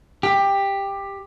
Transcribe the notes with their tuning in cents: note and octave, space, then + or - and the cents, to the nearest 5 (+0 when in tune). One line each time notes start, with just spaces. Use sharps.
G4 +15